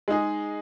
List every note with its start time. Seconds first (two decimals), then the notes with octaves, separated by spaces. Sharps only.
0.08 G#3 D#4 G#4